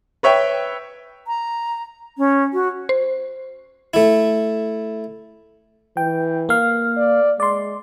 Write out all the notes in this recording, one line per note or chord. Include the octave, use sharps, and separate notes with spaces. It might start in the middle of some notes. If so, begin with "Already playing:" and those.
B4 C#5 E5 G5
A#5
C#4
F#4
C5
A3 E4
E3 G5
A#3 F5
D5
G#3 D5 C6